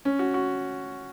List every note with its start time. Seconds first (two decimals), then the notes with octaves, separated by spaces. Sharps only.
0.05 C#4
0.19 F#4
0.34 F#4